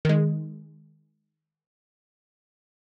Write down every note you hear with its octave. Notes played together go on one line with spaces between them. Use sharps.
D#3 G#3